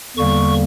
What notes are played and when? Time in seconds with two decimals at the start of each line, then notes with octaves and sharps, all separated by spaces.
0.17 E2 D3 G3 A#3 C#6